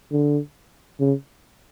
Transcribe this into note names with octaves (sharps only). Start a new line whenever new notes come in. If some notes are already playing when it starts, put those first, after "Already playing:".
D3
C#3